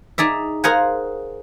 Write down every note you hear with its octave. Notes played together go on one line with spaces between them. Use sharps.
D#4 G#4 D5 E5
G#4 A#4 C5 F5 F#5 G#5